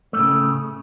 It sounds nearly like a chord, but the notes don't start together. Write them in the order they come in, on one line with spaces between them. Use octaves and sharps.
A3 A2 C#3